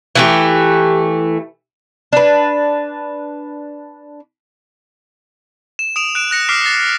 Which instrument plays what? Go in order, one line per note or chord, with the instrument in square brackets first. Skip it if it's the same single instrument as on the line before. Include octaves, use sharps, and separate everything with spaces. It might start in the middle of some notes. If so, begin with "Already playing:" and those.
[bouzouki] E3 A3 G4
D4 B4
[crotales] E7
D#6 D7 E7 F7
F#6 D7 E7
F#6 A#6 C#7
D6 F6 B6 C7 D7
A6 C7